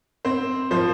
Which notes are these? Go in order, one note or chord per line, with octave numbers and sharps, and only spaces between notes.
C4 C5
F3 C5